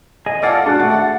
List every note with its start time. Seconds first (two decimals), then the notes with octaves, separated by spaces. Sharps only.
0.26 G#4 D#5
0.43 F4 A4 D5 F#5 F6 A6 C7
0.66 G#3 D4 F#4 A5 F#6
0.80 A3 A6